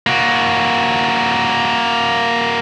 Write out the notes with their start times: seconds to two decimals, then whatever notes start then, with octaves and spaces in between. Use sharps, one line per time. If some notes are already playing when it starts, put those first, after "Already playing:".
0.07 A#3 F#4